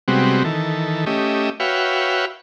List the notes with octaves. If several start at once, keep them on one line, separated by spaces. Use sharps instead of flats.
C3 G3 G#3 B3 C4 F#4
D#3 E3 A4
A3 C#4 G4 D#5 E5
F#4 B4 C#5 E5 F5 G5